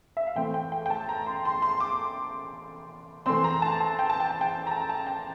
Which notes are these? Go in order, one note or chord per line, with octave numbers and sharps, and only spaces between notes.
E5
F5
A2 E3 A3 C4 G5
G5
G5
G5
A5
A#5
C6
C6
C6
D6
E3 A3 C4 C6
A#5
A5
A5
G5
A5
G5
A5
G5
A#5
A5
A5
G5